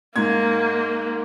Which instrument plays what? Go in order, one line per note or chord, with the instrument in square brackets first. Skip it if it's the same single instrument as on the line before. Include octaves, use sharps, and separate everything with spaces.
[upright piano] G#2 G#6 [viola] A#3